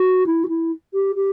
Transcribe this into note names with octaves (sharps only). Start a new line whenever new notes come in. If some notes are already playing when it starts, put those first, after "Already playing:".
Already playing: F#4
E4
F#4
E4
G4
G4